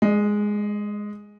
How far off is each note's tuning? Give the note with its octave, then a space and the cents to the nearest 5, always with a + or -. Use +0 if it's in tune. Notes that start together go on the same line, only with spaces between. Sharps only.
G#3 +0 D#5 -45